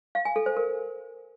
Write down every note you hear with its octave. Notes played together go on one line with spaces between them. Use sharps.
F5
G#5
A4
C5
A#4